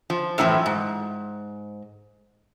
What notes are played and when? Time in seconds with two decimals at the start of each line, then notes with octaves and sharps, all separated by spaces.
0.10 F3
0.38 F#2 A2 E3 F3
0.66 G#2